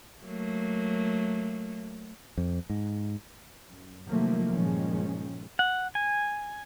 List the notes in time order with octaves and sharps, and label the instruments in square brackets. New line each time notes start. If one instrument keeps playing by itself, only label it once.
[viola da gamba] F#3 A3 A#3
[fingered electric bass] F2
G#2
[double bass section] F#2
C3 D#3 F3 F#3 A3 A#3
G2 A#2 D#3 F3 G#3 C#4
[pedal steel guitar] F#5
G#5